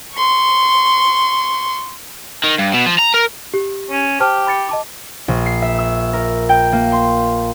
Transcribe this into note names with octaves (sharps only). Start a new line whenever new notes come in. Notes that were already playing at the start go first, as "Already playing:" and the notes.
C6 C#6
D#3
G2
B2
F3
A#5
A#4
G4
C#4
G4 C5 A5 F6
B5 A6 C#7
D#5 A5 D6
A#1
C7
E5
E6
A#4
G5
A#3
C6